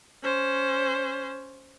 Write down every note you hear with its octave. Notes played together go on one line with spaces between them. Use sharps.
C#4 C5